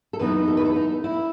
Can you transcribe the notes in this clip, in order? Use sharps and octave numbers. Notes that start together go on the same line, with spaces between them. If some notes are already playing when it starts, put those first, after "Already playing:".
A4
F#2 E3 B3 D#4 B4
A4
B4
A4
D#4
E4